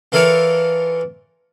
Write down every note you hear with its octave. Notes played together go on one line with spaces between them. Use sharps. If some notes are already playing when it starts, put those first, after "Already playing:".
E3 F4 A4 A#4 C#5